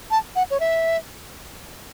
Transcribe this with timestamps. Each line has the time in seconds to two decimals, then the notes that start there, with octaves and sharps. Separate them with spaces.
0.11 A5
0.36 F#5
0.50 C#5
0.60 E5